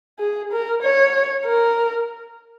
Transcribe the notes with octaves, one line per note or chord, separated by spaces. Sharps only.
G#4
A#4
C#5
A#4